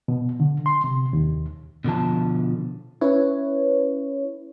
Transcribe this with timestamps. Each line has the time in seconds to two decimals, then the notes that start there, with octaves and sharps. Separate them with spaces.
0.08 B2
0.40 D3
0.66 C6
0.84 C3
1.13 D#2
1.84 B2 D3 F3 A5
3.01 C#4 E4 B4 C#5